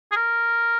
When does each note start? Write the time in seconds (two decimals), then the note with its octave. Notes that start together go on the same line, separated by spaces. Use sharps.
0.12 G#4
0.16 A#4